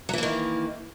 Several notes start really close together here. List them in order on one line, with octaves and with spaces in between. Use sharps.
F#3 E3 A#3 D#3